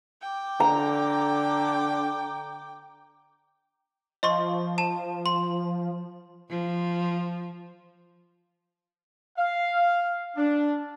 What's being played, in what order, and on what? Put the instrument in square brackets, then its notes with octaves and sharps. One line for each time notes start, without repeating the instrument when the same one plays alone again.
[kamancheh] G5 D6
[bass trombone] D3 [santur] A#5
[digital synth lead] F3 [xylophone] D#5 C6 C#6
[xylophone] A5 E7
C6
[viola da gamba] F3
[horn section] F5
D4